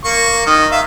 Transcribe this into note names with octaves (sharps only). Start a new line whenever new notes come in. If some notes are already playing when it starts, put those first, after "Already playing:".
A#3 C#6
D#3
E5 F5